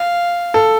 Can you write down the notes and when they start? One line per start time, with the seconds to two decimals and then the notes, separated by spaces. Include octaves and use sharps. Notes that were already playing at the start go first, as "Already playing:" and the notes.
Already playing: F5
0.54 A4